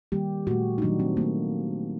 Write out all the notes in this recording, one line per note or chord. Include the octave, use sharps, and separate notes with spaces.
D#3 G3 A#3 G4
A#2 A3 F#4
D#4
D#3 F#3 A3 D4
C4
D#3 A3 A#3